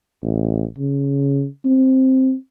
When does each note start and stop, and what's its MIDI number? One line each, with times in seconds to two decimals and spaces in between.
0.23 0.65 33
0.78 1.46 49
1.65 2.34 60